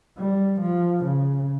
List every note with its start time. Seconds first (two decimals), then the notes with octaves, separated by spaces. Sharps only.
0.17 G3
0.61 F3
1.05 C#3